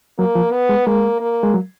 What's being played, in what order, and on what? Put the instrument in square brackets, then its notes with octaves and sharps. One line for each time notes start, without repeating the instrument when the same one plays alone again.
[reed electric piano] F#3 [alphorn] A#3
[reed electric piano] F3
[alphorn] B3
[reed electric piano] G#3
[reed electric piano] G#3 [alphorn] A#3
[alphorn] A#3
[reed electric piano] G#3
F#3